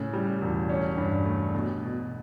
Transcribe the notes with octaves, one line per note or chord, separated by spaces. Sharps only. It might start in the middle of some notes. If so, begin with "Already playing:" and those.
Already playing: A2 C#3
G3
E1
C#4
G2
A3
B2
B2